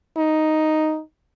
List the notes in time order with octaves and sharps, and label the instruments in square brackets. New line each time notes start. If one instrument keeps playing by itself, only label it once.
[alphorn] D#4